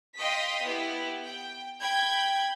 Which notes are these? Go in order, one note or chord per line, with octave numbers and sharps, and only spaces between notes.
D#5 F5 G5 C6 D#6 B6
B3 E4 G4
G5
G5 B5 G6 G#6